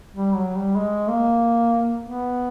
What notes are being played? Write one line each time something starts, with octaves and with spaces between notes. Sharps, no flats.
G3
F#3
G3
G#3
A#3
B3